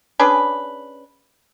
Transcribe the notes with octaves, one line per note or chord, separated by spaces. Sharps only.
C#4 D4 G#4 B4